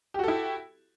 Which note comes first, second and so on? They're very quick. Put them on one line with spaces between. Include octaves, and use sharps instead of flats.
G4 F#4 A4 E4